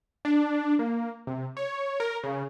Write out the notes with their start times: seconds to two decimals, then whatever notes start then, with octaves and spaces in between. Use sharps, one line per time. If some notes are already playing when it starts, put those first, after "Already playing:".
0.25 D4
0.79 A#3
1.27 C3
1.57 C#5
2.00 A#4
2.23 C#3